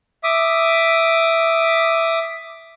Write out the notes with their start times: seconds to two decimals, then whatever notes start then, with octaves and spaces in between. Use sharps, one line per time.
0.24 E5 D6 D#6